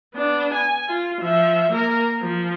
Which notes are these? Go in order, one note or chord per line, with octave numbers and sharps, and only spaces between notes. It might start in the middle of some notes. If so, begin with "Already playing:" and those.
B3 D4
G#5
F4
F3 E5
A#3 A#4
F3